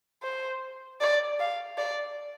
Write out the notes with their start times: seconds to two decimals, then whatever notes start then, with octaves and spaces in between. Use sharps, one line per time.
0.23 C5
1.01 D5
1.40 F5
1.78 D5